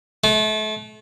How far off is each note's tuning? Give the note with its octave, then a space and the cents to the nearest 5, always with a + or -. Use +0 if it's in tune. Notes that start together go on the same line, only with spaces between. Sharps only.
A3 -35